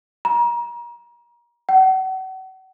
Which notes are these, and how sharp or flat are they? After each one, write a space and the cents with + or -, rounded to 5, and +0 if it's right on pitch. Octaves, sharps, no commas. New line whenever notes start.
A#5 +35
F#5 +40